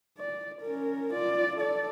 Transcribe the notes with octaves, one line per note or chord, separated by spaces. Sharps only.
D5
C#4 A#4
F4 D5
A4 D5